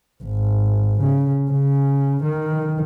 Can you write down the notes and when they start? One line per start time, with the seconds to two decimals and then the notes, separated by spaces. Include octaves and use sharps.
0.23 G#1
1.02 C#3
1.51 C#3
2.24 D#3